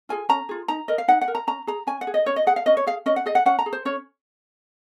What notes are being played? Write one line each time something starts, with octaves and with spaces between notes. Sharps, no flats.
F4 G#4 G#5
C#4 A#5
F4 G#4
D#4 A#5
A#4 D#5
F5
D#4 F#5
F#5
A#4
A#5
C#4 A#5
G#4 A#5
C#4 G#5
F#5
G#4
D#5
C#4 C#5
D#5
G#4 F#5
F5
C#4 D#5
C#5
G#4 F5
C#4 D#5
F#5
G#4 D#5
F#5
C#4 F#5
A#5
G#4
C5
C#4 C#5